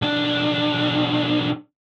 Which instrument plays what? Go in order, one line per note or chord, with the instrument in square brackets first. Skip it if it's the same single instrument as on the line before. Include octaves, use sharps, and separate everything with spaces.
[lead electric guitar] B1 D4